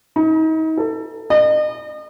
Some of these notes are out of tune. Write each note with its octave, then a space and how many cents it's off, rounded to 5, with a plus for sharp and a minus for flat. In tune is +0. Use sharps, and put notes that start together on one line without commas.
D#4 +35
A4 +25
D#5 -40